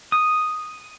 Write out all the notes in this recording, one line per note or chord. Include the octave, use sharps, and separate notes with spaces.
D#6